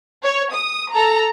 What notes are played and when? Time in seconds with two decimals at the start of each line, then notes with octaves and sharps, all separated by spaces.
0.23 C#5
0.54 D#6
0.92 A4 A#5